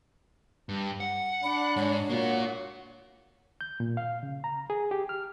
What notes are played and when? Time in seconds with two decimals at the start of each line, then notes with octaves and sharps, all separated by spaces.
0.69 G2
1.00 F#5
1.43 D4 B5
1.76 G#2 C#5
2.10 A#3 F4 F#4
3.61 G6
3.80 A#2
3.97 F5
4.23 C#3
4.44 A#5
4.70 G#4
4.91 G4
5.09 F6